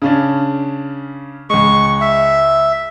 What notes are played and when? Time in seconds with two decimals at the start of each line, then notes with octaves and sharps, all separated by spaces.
0.02 C#3 C#4 D4
1.50 C#2 G#3 C#6
2.01 E5